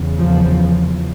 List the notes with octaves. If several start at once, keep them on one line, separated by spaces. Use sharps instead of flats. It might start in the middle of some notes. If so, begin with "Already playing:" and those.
Already playing: E2 C#3
F3